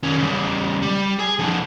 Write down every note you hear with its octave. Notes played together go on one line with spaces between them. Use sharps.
D#3 C#4
C#3 G3
G3
G#4 G#5
D3 F3